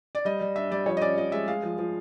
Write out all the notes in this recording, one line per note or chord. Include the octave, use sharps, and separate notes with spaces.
D5
G3 D#5
G3
D4 E5
G3 D5
F3 C#5
D#5
C#4 D5
F3 D#5
G#3 E5
G#3 F5
F3
F3